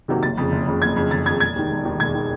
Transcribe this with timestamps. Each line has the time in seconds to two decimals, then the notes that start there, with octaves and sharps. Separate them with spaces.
0.08 C3 D#3 F#3 A#3
0.22 F#1 A6
0.38 F2 C#3
0.52 F#1
0.67 F2 C#3
0.82 F#1 G#6
0.96 F2 C#3
1.11 F#1 A6
1.26 F2 C#3 G#6
1.40 E1 G#6
1.56 D#2 D#3
1.70 E1
1.85 D#2 D#3
2.00 E1 G#6
2.15 D#3